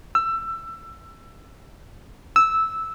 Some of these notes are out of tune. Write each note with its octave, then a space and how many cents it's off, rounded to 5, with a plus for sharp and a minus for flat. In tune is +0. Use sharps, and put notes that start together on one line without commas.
E6 +20
E6 -10